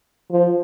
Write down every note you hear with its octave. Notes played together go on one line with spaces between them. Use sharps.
F3